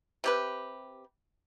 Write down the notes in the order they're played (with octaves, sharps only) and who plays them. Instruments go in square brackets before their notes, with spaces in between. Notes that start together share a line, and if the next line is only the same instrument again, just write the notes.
[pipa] C3 G4 B4